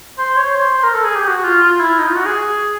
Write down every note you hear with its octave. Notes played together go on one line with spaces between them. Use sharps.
C5
C#5
C5
C5
A#4
A4
G#4
G4
F#4
F4
F4
E4
D#4
F4
F#4
G#4